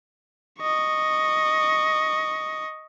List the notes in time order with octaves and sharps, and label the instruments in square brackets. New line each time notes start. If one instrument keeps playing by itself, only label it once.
[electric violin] D#5 C#6